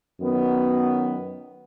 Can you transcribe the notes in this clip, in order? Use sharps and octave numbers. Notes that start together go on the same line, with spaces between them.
F#2 D#3 F#3 B3